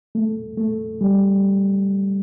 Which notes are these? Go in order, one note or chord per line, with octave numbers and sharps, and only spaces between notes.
A3
A3
G3